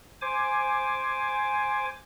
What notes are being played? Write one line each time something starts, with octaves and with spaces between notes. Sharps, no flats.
C5 G#5 D6